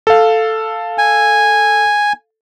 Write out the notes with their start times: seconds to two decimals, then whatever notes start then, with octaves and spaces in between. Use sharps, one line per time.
0.07 A4 F5
0.98 G#5